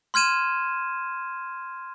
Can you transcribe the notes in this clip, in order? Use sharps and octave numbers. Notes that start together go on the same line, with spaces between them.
C6 F6 G#6 D#7 E7